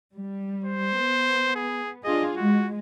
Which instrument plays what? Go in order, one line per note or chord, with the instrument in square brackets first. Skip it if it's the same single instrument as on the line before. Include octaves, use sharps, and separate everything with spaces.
[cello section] G3
[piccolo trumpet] C5
[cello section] B3
[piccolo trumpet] G#4
[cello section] D4 F4 G#4 [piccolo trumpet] D#5
[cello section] G#3 [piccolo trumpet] F#4